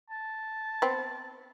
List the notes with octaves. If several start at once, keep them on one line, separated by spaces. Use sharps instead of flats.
A5
B3 C4